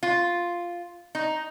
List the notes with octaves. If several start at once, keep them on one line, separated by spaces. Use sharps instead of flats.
F4
D#4